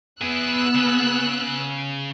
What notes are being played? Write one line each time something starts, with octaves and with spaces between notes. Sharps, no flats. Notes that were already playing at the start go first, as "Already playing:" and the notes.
B3 E4 G#4 E6 F#6
C#3